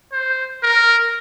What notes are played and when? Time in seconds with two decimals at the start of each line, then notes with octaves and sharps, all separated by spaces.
0.12 C5
0.63 A#4